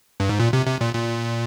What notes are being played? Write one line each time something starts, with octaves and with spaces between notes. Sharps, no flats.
G2
G#2
A#2
C3
C3
A#2
A#2